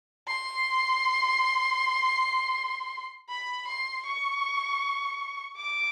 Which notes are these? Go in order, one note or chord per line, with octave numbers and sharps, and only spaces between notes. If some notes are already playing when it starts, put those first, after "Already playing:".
C6
B5
C6
C#6
D6